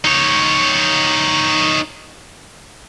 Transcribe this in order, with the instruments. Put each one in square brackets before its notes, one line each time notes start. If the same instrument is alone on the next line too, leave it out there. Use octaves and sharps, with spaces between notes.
[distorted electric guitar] D#4 C#5